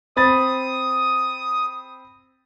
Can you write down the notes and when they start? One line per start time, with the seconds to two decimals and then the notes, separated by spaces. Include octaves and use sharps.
0.17 C4 B5 D#6 A6